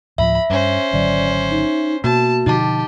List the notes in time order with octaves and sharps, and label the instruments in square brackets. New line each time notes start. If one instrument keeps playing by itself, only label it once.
[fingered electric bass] D2 A2 F3 [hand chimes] E5 [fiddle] B5
[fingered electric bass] G2 [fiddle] C#4 C5
[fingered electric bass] G#1 D3 F#3 [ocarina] D5
[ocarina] D#4
[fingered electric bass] B2 [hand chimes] A#3 [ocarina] F#4 [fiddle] A5
[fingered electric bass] B2 D3 F3 [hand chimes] D#4 A5 [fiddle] G4